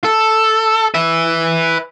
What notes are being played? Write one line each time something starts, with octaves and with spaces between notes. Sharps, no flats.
A4
B4 E5